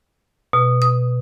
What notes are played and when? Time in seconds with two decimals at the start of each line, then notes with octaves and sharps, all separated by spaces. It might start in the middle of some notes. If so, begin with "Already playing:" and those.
0.53 B2
0.82 D#6